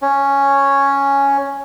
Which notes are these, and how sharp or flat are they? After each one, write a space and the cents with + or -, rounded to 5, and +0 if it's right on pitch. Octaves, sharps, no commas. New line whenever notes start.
C#4 +0